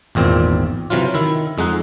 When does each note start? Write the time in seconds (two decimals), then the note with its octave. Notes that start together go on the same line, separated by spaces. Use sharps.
0.15 G#1 E2 A#2 C4
0.90 C3 E3 F#3 F4
1.14 D#3 E4
1.58 F2 G#3 D#4 F#5